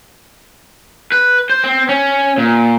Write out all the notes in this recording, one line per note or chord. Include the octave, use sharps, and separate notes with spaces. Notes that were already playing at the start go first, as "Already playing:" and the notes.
B4
C5
C4
C#4
A#2